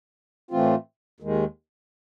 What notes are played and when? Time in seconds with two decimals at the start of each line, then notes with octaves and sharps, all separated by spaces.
0.51 A2 E3 A3 C4 F4
1.20 D#2 D#3 G#3